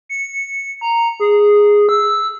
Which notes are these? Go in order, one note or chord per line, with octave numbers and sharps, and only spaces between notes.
C#7
A#5
G#4
E6